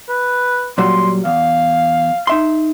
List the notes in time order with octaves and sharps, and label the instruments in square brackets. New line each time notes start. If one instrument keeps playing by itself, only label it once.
[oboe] B4
[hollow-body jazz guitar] A#2 F#3 G3 [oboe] C6
[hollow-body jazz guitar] E2 [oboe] F5
[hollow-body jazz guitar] D#4 E5 C6